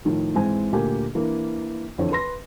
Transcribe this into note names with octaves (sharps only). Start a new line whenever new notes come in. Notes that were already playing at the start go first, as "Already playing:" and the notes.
A2 D#3 F3
G#2 E3 G#3 C4 G#5
D2 A#2 A#3 G4 G#5
E3 A#3 D4
F2 D3 E3 C4 C#5
B4 C6 A#6